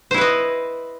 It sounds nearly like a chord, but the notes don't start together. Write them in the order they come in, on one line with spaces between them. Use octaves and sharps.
C5 E4 B4 D#5